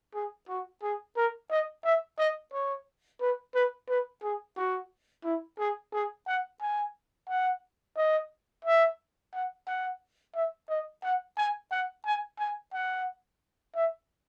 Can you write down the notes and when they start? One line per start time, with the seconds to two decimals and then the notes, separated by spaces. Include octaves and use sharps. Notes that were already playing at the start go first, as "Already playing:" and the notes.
0.14 G#4
0.49 F#4
0.82 G#4
1.16 A#4
1.50 D#5
1.84 E5
2.18 D#5
2.53 C#5
3.21 B4
3.55 B4
3.89 B4
4.23 G#4
4.57 F#4
5.24 E4
5.59 G#4
5.93 G#4
6.27 F#5
6.61 G#5
7.29 F#5
7.97 D#5
8.65 E5
9.33 F#5
9.67 F#5
10.34 E5
10.69 D#5
11.03 F#5
11.37 G#5
11.71 F#5
12.05 G#5
12.39 G#5
12.73 F#5
13.75 E5